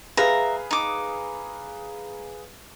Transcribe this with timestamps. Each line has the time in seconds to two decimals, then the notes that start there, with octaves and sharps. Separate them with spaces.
0.17 G#4 B4 E5 F5 A#5
0.71 D#4 D6